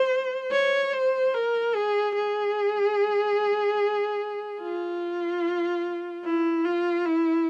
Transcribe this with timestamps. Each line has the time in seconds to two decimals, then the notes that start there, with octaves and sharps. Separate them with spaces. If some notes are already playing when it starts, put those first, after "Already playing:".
Already playing: C5
0.52 C#5
0.93 C5
1.35 A#4
1.75 G#4
2.16 G#4
4.61 F4
6.25 E4
6.65 F4
7.06 E4